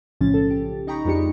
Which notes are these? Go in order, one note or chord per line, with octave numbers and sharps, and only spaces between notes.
B1 A2 C#3 F3 C#4 A6
A4
G4
D#4 D#5 G5 A#5 B5 C#6
F2 F3 G#3 D4 G4 C#7